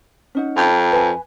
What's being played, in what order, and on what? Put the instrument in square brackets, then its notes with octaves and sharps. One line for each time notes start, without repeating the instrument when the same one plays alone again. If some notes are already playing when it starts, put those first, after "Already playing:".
[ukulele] C#4 D#4 F#5
[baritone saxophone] F2
[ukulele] A5
B4 G#5